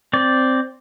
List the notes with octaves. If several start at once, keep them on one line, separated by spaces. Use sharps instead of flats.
C4 D5